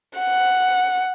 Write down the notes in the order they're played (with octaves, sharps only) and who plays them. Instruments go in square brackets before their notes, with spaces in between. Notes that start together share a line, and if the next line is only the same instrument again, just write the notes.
[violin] F#5